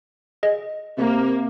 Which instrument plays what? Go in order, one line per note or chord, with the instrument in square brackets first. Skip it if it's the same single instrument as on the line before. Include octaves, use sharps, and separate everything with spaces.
[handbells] G#4 D#5
[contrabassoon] C3 [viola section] A#3